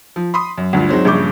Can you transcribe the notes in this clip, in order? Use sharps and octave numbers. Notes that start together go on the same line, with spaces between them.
F3
B5 C6 D#6
F#2
D2 G2 F4
F#3 G#3 C4 D#4
A#1 G2 C#3 C#6 D6 G6